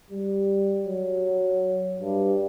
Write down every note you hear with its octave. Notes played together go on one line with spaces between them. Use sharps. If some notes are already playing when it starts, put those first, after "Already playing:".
G3
F#3
G2